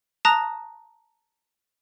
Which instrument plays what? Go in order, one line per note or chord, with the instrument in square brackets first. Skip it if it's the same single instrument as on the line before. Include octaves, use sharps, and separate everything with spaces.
[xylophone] A5 A#5 D#6 F#6 A#6